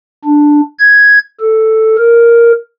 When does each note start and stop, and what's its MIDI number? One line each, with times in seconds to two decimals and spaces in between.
0.25 0.61 62
0.79 1.18 92
1.40 1.96 69
1.98 2.52 70